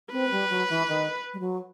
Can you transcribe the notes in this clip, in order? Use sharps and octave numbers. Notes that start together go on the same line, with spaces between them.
C4 B4
G3
F#3
E3
D#3
G3
F#3